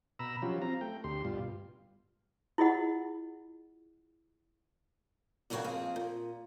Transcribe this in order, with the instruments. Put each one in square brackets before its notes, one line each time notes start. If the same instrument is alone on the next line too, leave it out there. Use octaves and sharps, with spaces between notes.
[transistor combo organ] B2 A#5 B5 E6
F3 F#3 C#4 F4 G4
C4 F4 A#5
A3 G5
D2 G4 C6
G2 B2 G3 F4
[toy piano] E4 F4 G#4 D#5 F#5
[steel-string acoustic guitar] E2 G2 C#3 F#4 C#5 G5
F2 A#3 C4 G#4
A#2